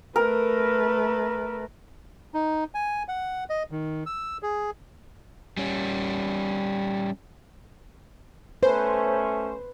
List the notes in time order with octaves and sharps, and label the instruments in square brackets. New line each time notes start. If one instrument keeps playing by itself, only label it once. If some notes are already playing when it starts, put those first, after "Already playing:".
[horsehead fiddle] A3 B4 [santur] A#4
[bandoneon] D#4
G#5
F#5
D#5
D#3
E6
G#4
[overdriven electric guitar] G3 C#4
[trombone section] A3 C#4 [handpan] B4 [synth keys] C5